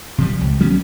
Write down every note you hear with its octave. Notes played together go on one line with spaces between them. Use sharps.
C3 F3 G3
C#2
F#3 G3 B3 C#4